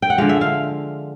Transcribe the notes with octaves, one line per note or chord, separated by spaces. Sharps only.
G5
F#5
D3 F3 G#3 F5
E5
F5